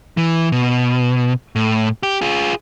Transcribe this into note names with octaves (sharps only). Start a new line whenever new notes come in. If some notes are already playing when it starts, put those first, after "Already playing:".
E3
B2
A2
G4
F4 G#4